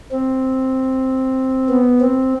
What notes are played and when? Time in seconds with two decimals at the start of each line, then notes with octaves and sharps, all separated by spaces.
0.11 C4
1.69 B3
2.01 C4